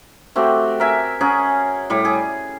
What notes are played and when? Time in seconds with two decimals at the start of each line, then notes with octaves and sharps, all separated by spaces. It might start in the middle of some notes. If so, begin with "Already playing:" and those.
0.36 A3 C4 F#4 G4
0.80 A#4 E5 G#5
1.21 C#4 G#4 A#4 F#5
1.90 A2 G3
2.05 G#4